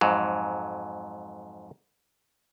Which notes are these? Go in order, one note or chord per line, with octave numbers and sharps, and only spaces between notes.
F2 G#2 F#3